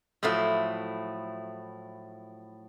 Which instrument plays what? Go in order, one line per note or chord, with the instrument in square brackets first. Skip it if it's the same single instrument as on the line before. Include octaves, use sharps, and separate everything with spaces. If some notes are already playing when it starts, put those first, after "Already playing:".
[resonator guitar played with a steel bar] A2 F3 F#3 A3 E4